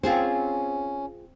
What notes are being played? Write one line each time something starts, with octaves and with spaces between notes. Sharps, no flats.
C4 C#4 F4 G#4 C5